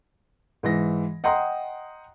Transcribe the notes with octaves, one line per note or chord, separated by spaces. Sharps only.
G#2 E3 A#6
D#5 F#5 G5 A#5 C6 D#6